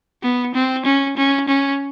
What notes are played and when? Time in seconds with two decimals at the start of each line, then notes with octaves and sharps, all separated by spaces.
0.23 B3
0.55 C4
0.85 C#4
1.17 C#4
1.48 C#4